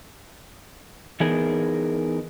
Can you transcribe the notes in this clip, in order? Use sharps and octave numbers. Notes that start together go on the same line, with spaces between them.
E3 B3 D#4 G#4 A#4